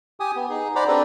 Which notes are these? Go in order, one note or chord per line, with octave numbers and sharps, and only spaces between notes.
G4 G#5 D#6
B3
D#4 G#4
C5 D5 F#5 A#5 B5 D6
C4 D4 G4 A4 B4 D5